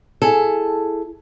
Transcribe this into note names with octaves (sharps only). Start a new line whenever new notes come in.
E4 G#4 A4